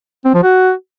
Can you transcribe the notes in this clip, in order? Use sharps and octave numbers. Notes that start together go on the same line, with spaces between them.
C4
F3
F#4